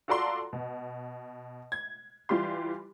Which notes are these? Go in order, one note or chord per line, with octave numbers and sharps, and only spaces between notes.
F4 F#4 A4 D5 A#5 C6
B2
G#6
E3 G3 F4 G4 C6